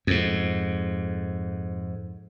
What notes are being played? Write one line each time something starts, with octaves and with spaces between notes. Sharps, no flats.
F2 G#2